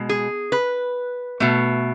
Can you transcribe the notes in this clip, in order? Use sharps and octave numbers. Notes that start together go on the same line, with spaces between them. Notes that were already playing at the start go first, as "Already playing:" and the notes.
Already playing: B2 G#3
G#4
B4
B2 A3